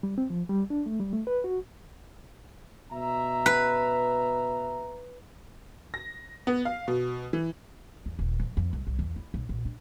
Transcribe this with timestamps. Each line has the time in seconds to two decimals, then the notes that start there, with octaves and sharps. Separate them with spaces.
0.03 G3
0.18 C4
0.30 F3
0.50 G3
0.70 D4
0.86 A3
1.00 G3
1.13 A3
1.27 B4
1.44 F#4
2.91 B2 E5 A#5
3.46 B4
5.94 A#6
6.47 B3
6.65 F5
6.88 B2
7.33 E3
8.06 E2
8.19 D#1
8.40 F2
8.57 F2
8.73 C2
8.87 C2
8.99 E2
9.16 E4
9.34 B1
9.49 A#1
9.65 D4